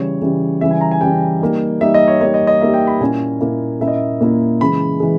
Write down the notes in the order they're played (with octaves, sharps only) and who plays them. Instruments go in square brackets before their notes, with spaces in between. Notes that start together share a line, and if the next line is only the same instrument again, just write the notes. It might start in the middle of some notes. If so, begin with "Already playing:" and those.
Already playing: [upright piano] C#3 E3 G3 [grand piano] C#5
[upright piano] C#3 E3 G3
[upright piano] C#3 E3 G3 [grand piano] E5
[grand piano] G#5
A#5
G#5
[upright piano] C#3 E3 G3 [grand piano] G5
[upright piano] G3 A#3 D#4
[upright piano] G3 A#3 D#4 [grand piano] E5
[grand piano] D#5
C#5
[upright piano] G3 A#3 D#4 [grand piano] C#5
[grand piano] D#5
D#5
[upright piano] G3 A#3 D#4 [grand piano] E5
[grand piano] G5
B5
[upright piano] A#2 A#3 C#4 E4 [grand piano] G#5
[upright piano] A#2 A#3 C#4 E4
[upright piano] A#2 A#3 C#4 E4 [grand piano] E5
[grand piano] D#5
E5
[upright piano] A#2 A#3 C#4 E4
[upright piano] C#3 E3 G#3 [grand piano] B5
[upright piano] E3 G#3